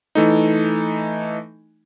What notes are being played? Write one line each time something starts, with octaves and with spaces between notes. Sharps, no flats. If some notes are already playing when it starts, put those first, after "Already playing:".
E3 A3 D#4